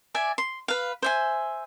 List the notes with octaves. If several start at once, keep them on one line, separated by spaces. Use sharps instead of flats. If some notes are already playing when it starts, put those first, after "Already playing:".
D5 E5 G#5
C6
B4 F5
C5 E5 G#5